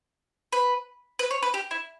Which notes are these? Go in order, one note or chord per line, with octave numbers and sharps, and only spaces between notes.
B4
B4
C#5
B4
G4
E4